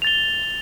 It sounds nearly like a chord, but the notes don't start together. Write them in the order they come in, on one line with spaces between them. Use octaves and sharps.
F7 A6 G7